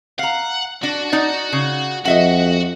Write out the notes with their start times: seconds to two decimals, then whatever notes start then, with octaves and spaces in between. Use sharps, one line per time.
0.19 F5 F#5 A#5
0.83 D4 F#4
1.12 D#4 D5
1.53 C#3
2.05 F2 F#4 D#5 E5 F#5